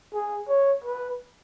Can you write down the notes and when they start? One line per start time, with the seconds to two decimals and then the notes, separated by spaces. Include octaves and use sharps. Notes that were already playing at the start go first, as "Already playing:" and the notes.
0.14 G#4
0.48 C#5
0.84 B4